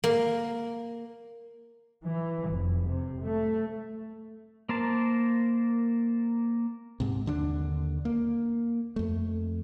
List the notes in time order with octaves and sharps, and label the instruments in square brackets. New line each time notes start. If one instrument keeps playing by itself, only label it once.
[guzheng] A#3
[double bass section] E3
F1
C3
A3
[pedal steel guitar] A#3 A#4 C5 A5
[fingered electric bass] G#2 C3
D#2 D3 F3 D4
A#3
F2 A3